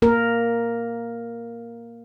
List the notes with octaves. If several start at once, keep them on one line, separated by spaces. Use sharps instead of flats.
A#3 A#4